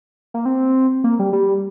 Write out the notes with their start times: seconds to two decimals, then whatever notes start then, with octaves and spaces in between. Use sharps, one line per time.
0.34 A#3
0.45 C4
1.04 A#3
1.19 G3
1.33 G3